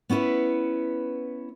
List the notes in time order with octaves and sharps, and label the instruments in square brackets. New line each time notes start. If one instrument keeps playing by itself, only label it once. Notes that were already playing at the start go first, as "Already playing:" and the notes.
[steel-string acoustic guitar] B3 C#4 E4 B4